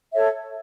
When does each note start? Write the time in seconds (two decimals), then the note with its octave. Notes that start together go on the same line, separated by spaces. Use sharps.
0.13 A4 C#5 E5